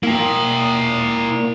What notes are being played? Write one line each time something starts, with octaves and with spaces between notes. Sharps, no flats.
A#2 A#3 E4 G5